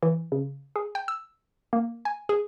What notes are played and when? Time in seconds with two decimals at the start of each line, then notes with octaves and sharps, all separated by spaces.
0.03 E3
0.32 C#3
0.76 G#4
0.95 G5
1.08 E6
1.73 A#3
2.05 G#5
2.29 G#4